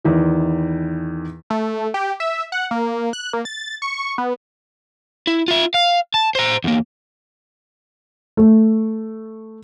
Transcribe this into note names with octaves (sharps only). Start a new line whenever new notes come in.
E2 D#3 E3
A3
G4
E5
F#5
A#3
F#6
A#3
A6
C#6
B3
E4
F4 E5
F5
A5
C5 A#5
E2 A#3
A3